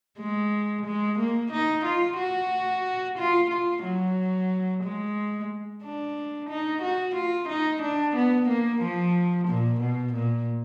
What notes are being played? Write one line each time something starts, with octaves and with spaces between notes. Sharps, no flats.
G#3
G#3
A#3
D#4
F4
F#4
F4
F4
F#3
G#3
D4
D#4
F#4
F4
D#4
D4
B3
A#3
F3
A#2
B2
A#2